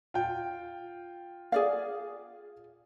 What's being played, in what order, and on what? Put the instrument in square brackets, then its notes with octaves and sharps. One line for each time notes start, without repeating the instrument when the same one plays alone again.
[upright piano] F4 G5
[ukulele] G#4 D5 F5